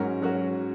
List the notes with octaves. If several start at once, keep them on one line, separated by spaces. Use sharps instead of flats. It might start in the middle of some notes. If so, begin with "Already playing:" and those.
Already playing: G#2 F#3 C#4 F#4 A#4
F#3 C#4 F#4 A#4